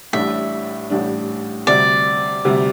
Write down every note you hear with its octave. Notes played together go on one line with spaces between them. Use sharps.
A1 A2 G3 D4 E5
A1 A2 G3 D4
D2 C3 G3 D5
D2 C3 G3